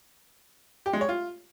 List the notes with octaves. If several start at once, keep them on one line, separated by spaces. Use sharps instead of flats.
G4
G#3
C#5
F4